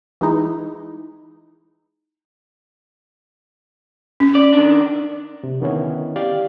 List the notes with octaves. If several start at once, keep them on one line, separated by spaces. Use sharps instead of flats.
E3 G#3 D#4 E4
C#4
D5
D#3 D4
C3
D3 D#3 B3 C#4 E4
G4 D5 F5